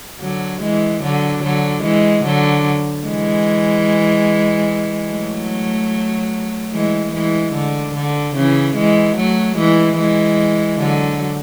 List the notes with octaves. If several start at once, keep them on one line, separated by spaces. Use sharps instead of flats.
D3 F#3
E3 G#3
D3 F#3
D3 F#3
E3 G#3
D3 F#3
E3 G#3
F#3 A3
E3 G#3
E3 G#3
D3
D3
C#3 E3
E3 G#3
F#3 A3
E3 G#3
E3 G#3
D3 F#3